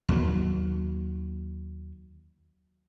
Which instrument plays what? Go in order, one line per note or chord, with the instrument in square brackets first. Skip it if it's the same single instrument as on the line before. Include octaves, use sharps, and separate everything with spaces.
[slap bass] D#2 F#3